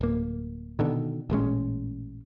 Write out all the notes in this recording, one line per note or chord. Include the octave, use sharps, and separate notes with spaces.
D1 A#3
B2 D3 D#3
A1 A#2 G#3 C#4